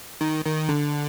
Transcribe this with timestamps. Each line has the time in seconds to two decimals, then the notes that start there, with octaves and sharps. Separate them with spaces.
0.21 D#3
0.45 D#3
0.69 D3